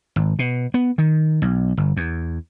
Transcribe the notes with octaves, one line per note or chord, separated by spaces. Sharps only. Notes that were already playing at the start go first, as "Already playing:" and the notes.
G#1
B2
B3
D#3
B1
G1
E2